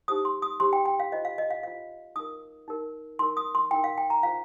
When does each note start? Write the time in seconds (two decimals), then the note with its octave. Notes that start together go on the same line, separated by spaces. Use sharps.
0.08 D#4 G4 C5 D#6
0.25 C6
0.42 D#6
0.60 D#4 G4 C5 C6
0.73 G5
0.86 G5
1.00 F5
1.12 F4 C5 D#5
1.25 F5
1.38 D#5
1.51 F5
1.63 F4 C5 F5
2.16 D#4 A#4 D#6
2.68 D#4 A#4
3.19 D#4 A#4 C6
3.37 D#6
3.55 C6
3.71 D#4 A#4 G5
3.84 F5
3.98 G5
4.10 A#5
4.23 F4 C5 F5